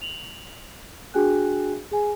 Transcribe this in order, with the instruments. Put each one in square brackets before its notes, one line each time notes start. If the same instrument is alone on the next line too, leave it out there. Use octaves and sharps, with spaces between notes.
[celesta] F7 F#7
D4 F#4 G#4 G5 G#5 F#6
G#4 G#5